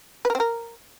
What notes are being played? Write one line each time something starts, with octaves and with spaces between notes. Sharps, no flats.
B4
A#4
C4
A#4